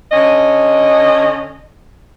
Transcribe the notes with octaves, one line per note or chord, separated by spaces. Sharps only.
D3 C#4 D#5